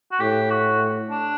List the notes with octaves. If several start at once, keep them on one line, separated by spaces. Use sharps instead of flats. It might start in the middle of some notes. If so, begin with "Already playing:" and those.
F#4
A2 G4
F#4
D4